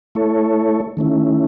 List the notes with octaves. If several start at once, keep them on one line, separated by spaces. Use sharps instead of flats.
A3 E4 A4 C#5
D#3 A3 C#4 E4